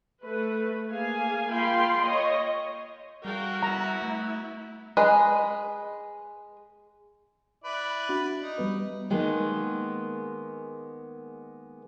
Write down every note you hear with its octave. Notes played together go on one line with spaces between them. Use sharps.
A3 B4
A#3 G#4 F5 G#5
A#3 F4 F5 G5 B5 C6
C#5 D#5
G3 F#4 A#4 F5 G5
B3 E4 E5 A#5
A3
G#3 B4
E4 B4 D5
D4 F#4
D#4
G3 B3 B4
D#3 G#3 A#3 B3